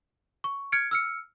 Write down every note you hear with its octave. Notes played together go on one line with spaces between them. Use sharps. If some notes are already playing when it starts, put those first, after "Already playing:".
C#6
F6 G#6 C#7 D7
E6 F6 C#7